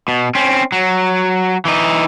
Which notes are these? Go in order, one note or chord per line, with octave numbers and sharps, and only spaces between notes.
B2
C4 C#4
F#3
E3 D#4